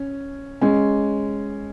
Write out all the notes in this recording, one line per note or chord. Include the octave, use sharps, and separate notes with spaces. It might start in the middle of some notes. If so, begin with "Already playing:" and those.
Already playing: C#4
G#3 C#4